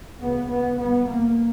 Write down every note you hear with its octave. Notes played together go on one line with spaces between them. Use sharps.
D2 C#3 B3
B3
G1 G2 B3
A#3